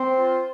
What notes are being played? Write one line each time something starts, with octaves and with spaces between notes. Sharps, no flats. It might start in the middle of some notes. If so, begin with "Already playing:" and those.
Already playing: C4 C5
F4